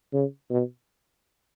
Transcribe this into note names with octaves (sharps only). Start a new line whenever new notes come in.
C#3
B2